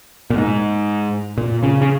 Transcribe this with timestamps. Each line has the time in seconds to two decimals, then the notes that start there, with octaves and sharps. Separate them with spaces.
0.30 A#2
0.37 G#2
1.38 A#2
1.63 C#3
1.82 C#3